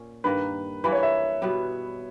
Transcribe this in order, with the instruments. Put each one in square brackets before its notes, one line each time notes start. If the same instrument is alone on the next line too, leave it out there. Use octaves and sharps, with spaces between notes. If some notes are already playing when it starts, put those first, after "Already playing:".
Already playing: [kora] A#2 C#4
[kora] G2 D#3 A#3 [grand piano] B4
[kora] E3 G3 A#3 [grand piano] B4
[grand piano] C#5
E5
[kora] B2 G3 B3